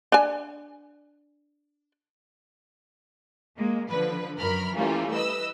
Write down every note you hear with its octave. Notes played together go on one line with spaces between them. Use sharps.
D4 G#5
G#3 A#3
D3 F3 B4
F#2 A#4 B5 F6
E3 G3 A3 A#3 C#4 F4
B4 D#5 E6